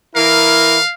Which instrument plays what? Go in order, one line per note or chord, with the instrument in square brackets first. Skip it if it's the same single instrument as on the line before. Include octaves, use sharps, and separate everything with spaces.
[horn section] E3 E4 A#4 [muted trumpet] F5